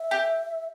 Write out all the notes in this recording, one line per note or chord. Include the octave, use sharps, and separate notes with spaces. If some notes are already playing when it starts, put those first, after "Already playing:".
Already playing: E5
G4